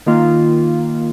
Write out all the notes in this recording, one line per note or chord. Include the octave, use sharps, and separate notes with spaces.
D#3 A#3 F4